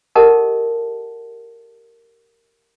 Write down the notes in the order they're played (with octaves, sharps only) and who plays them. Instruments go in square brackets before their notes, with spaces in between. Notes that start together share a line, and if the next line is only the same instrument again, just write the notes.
[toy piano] G4 A4 A#4 D#5 F#5 A5